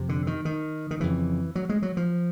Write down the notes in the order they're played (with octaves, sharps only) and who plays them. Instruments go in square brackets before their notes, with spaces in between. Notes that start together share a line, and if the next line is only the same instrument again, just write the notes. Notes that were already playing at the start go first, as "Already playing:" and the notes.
Already playing: [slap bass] F2 C3
D3
D#3
D#3
D#3
F2 C#3 E3
F#3
G#3
F#3
F3